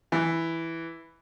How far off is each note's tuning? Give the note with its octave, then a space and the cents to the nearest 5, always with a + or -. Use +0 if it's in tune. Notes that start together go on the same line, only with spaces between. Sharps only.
E3 +0